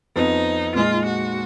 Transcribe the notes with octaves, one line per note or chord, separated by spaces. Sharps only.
F2 F3 B3 D#4
A#2 G#3 D#4 F4
F#4